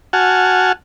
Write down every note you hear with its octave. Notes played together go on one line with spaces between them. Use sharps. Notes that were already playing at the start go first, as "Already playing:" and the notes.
F#4 F#5 G#5 A5 F6